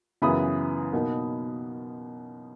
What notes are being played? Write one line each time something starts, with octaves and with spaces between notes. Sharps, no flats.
F#2 C#3 E3 B3 E4 B5 D#6
B2 A#3 D#4